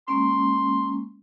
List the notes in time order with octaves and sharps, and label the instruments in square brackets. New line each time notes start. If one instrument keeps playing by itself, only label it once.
[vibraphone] G#3 A#3 C#4 [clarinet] C6